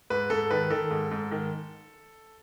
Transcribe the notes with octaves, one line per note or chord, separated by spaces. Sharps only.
G#2 B4
G#2 A4
D#3 B4
D#3 A4
G#2
G#2
D#3